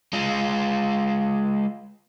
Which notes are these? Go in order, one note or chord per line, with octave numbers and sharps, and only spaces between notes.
G#3 F4